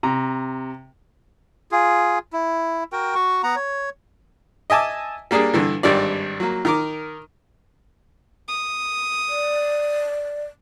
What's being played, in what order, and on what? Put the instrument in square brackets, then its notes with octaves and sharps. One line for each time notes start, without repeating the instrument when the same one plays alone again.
[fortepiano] C3 A#5
[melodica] F4 G#4
E4
F#4 A#4 G5
F#4 C#6
B3 F#5 A#5
C#5
[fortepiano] D#5 E5 G#5 A5 D6
G3 A#3 D4 G#4
G2 D3 E3
G#1 G2 G3 D5
F#3 A#3
D#3 A#4 D6
[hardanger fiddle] D#6
[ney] D5